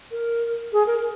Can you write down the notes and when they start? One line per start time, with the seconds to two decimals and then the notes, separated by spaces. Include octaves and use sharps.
0.11 A#4
0.73 G#4
0.87 A#4